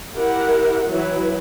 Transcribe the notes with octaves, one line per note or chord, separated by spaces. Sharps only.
E4 G4 A#4 F#5
E3 F#3 E4 B4